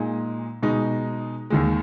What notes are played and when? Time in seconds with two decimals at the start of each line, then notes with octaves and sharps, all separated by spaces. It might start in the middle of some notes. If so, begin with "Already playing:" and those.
Already playing: A#2 G#3 D#4
0.63 B2 G#3 D#4
1.50 D#2 D#3 G#3